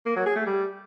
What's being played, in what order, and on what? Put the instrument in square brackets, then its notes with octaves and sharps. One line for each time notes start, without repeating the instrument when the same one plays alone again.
[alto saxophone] A#3
F#3
G#4
A3
G3